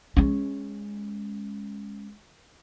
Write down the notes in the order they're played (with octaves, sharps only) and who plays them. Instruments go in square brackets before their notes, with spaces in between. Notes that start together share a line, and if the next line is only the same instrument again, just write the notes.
[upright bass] G#3 C#4